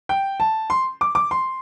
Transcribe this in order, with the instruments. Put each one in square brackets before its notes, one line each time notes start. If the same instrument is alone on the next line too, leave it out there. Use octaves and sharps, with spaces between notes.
[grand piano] G5
A5
C6
D6
D6
C6